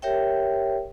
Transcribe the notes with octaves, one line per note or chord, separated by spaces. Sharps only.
G4 A#4 C#5 E5 G5